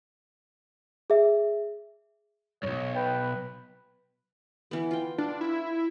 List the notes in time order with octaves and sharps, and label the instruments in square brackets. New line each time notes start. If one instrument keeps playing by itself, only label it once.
[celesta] G#4 E5
[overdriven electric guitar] B1 G2 [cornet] C#5
[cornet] B4 [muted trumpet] G5
[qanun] E3 B3
F4 G5
[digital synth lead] D4 [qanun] F4
[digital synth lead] E4